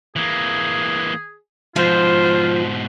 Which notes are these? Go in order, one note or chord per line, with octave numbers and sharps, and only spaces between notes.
E3 A#3 G#4
G#2 B2 F3 F4 C5